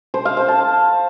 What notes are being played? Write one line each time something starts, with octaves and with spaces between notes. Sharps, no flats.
C5
F5
C5
A5